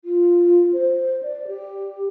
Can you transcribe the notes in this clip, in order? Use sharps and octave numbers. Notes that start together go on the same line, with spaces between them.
F4
C5
D5
G4